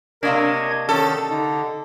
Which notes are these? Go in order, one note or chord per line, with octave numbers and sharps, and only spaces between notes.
C3 A#3 D4 A#4 C#5 D#5 G#6
D#3 C#4 A4
D3 D#4